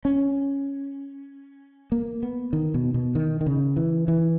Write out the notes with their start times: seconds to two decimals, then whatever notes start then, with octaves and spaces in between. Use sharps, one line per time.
0.05 C#4
1.92 A#3
2.23 B3
2.53 D#3
2.74 B2
2.94 B2
3.15 D#3
3.41 D#3
3.46 C#3
3.77 E3
4.08 E3